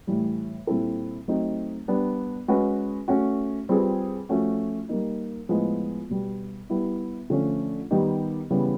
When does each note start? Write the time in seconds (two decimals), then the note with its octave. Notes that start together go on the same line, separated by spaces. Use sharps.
0.07 A2 E3 G3
0.67 A#2 G3 C4 E4 A4
1.28 F#3 A3 C4 D#4
1.88 G3 B3 D4
2.48 G#3 C#4 F#4 B4
3.08 A3 C#4 F#4
3.69 G3 C4 F4 G#4 B4
4.29 F3 A3 C#4 F#4
4.89 G3 A#3 D#4
5.49 A2 F3 G#3 B3 E4
6.10 B2 G3 B3
6.70 G3 B3 E4
7.30 D3 F3 A3 C#4
7.91 D#3 G3 B3 D#4 G4
8.50 C#3 E3 G3 B3